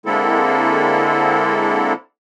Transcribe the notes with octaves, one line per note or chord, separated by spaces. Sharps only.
D3 G#3 A#3 C4 E4 A4